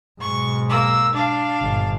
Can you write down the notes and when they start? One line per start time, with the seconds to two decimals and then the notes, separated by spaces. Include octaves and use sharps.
0.21 B1 G#2 C#6
0.69 A#3 E6
1.14 D4 F5
1.62 G1 A#2